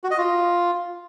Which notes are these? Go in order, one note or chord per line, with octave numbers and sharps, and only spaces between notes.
F#4
D#5
F4